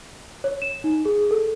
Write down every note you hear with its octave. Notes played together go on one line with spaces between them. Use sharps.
C#5
E7
D#4
G#4
A4